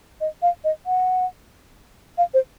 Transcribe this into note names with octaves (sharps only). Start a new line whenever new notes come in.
D#5
F5
D#5
F#5
F5
C5